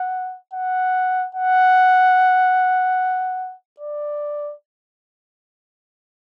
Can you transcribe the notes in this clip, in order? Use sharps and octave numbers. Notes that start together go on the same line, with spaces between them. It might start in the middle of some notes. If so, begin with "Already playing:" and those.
Already playing: F#5
F#5
F#5
D5